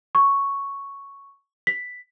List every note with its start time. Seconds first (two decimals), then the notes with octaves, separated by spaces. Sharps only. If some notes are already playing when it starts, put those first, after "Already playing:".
0.15 C#6
1.67 B6